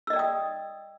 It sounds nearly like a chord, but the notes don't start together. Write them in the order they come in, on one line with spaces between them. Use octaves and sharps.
E6 D#5 D5 G5 D#6